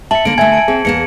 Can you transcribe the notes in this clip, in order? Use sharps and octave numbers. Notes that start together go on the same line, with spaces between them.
E5 A5 C#7 F#7
D3 A#3 D7
D3 A3 E5 G#5 G#6
A5 D7
C4 G#4
E2 A#3 A5 C#7